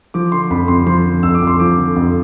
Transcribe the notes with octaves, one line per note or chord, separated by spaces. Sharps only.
F3 D6
D3 C6
F2 B5
F2 C6
F3 C6
D3
F2 E6
D6
F2
C6
F3 D6
D3
F2